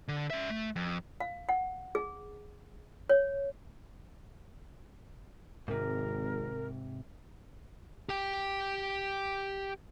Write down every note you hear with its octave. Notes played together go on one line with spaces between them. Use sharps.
D3
C#4 E5
A3
F2
F5
F#5
G#4
C#5
G#1 G#2 C3 A#4
G4 G5